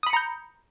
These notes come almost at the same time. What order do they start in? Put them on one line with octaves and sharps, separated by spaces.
D#6 B5 C#7 A#5 G6